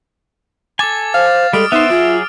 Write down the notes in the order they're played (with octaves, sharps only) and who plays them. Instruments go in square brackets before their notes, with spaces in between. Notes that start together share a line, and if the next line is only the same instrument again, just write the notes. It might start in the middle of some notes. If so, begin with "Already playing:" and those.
[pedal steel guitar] A4 G#5 [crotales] D6 A6
[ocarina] C5 [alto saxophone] F5
[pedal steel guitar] G3 G#3 [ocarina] A4 [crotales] D#6 F6 D7
[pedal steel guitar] B3 C5 [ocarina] D#4 [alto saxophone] E5
[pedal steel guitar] F#3 F#4 G#4 [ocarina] F4